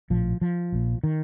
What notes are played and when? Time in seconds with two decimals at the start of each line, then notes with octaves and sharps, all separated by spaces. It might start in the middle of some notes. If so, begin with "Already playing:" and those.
0.10 A#1 A2 F3
0.41 F3
0.72 A#1 A#2
1.03 D#3